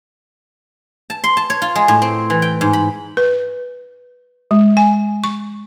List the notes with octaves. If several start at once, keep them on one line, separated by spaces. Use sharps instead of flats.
A5
C6
A5
C#5
F4
G#3
A2
C4
E3
G5
G#2
B5
B4
G#3
G#5
C#6